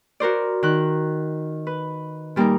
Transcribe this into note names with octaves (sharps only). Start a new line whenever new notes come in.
F#4 A#4 C5 D5
D#3 F#6
B4
A#2 G3 A#3 D#4 A#4